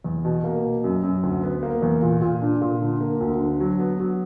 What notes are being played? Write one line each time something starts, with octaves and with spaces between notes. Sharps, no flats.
E2
B2
A#3
B2
F#2
F#2
D2
B3
A#3
E2
A#2
A#2
D4
A#2
D3
A#3
D2
D3
F#3
B3
F#3